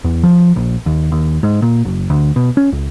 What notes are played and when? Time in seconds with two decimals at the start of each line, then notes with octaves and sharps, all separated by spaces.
0.04 E2
0.23 F3
0.56 A#1
0.86 D#2
1.12 D#2
1.43 G#2
1.62 A#2
1.85 F#1
2.10 D2
2.36 B2
2.57 C#4
2.72 C#2